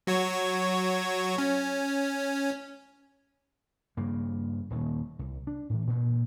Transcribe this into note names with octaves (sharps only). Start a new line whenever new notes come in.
F#3 F#4 C#5
C#4
G2 C#3 A#3
D#1 D#2
C2
D4
A2 E3
G2 A#2